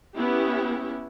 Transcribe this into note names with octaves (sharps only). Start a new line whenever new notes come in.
B3 C#4 E4 G4